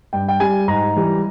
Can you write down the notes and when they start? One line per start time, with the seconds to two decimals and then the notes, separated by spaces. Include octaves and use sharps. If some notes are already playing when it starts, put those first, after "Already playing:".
0.13 G2 G5
0.28 G5
0.40 G3 G#5
0.68 G#2 A#5
0.96 E3 G3